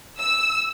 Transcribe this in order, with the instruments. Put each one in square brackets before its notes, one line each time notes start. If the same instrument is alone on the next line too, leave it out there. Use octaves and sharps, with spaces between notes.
[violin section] E6